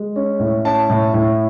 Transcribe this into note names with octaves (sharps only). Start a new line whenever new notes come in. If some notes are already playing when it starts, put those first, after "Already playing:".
Already playing: G#3
C#4
A2
C#4 A5
A2
A2